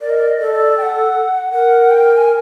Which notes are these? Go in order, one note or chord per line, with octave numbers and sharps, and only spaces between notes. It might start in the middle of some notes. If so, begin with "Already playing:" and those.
A#4 D5
D#5
D5
D#5
A4 D5
D#5
D5
G5
F#5
A#4 F#5
G5
G#5